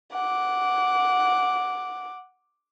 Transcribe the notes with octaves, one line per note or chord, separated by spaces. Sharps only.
F#5 D6